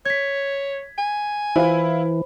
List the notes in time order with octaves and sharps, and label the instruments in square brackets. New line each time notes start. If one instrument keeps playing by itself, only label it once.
[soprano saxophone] C#5 [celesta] G#6 B6
[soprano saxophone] G#5
[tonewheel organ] E3 [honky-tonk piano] E4 F4 [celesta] C5 B5